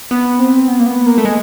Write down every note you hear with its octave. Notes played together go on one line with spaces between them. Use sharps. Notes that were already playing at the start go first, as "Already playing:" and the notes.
B3
C4
B3
A#3
B3
A#3
A3
G#3